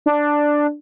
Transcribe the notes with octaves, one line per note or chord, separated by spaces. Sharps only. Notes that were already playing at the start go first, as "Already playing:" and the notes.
D4